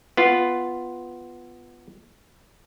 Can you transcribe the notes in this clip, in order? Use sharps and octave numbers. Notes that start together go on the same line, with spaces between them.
B3 F4